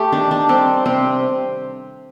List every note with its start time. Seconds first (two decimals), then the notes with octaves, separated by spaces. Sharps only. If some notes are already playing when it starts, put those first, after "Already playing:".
Already playing: A3 G4
0.12 D#3 D4
0.31 D4
0.49 G3 C4
0.86 C3 C4